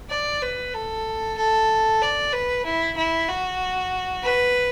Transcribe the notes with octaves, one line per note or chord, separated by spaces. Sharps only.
D5
B4
A4
A4
D5
B4
E4
E4
F#4
B4